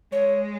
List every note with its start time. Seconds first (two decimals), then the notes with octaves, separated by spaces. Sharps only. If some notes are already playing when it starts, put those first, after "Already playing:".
0.12 G#3 C#5